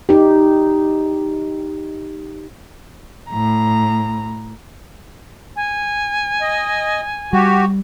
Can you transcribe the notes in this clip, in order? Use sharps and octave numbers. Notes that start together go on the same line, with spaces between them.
D#4 G4
A2 A#5
G#5
D#5
G3 F#4 G4